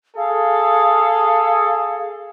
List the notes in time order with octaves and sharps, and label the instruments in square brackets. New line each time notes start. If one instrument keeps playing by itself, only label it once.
[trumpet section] G#4 A4 [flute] F5